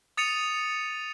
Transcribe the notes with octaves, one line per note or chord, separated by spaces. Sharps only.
D#6 A6 C#7 D#7 F7